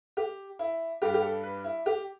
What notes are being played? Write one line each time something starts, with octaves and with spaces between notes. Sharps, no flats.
G4
E4
G2 G3 D4 G4
G4
A4
B4
E4
G4